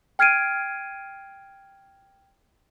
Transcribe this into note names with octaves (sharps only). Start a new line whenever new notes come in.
G5 F6 G#6 C7 D7 D#7